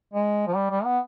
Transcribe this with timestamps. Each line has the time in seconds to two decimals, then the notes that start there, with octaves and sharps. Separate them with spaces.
0.14 G#3
0.47 F3
0.56 G3
0.71 G3
0.84 B3